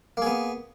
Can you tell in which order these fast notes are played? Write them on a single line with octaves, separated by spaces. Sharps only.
A#3 G#4 B3